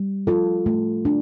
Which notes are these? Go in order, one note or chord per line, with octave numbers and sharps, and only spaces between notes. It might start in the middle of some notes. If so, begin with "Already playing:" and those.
Already playing: G3
F4 A4
A3
D4